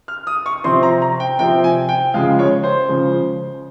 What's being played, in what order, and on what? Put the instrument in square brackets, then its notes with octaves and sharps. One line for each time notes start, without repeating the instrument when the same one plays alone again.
[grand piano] F6
D#6
C#6
C3 F3 C4 C6
A#5
A#5
G5
C3 F3 C4 G5
G#5
G5
C#3 F3 G#3 F5
C#5
C5
C#3 F3 G#3